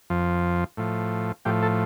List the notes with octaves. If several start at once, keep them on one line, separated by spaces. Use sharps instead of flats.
F2 F3
A2 F3
A2 F3 G4
A4